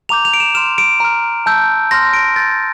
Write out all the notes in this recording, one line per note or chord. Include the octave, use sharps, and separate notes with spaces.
A#5 D6 G6 F7
F7
D7
E7
C6 F6 E7
D7
A#5 F6
A5 E6 G6
C6 F6 A#6
D7
C6 E6 G6 A6